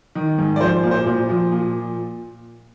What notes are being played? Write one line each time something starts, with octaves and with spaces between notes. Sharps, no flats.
D#3
G#2
D5
F3 C5
A#2
C5
A#2
F3
A#2